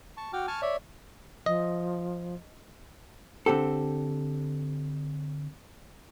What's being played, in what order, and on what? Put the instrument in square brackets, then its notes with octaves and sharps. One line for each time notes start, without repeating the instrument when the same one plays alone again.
[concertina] A5 C#6
F#4 G5 D6 F6
G#5 A5 C#6 F6
C#5 D5 E5
[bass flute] F3 [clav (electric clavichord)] D#5
[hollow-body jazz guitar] D3 C4 G4 A4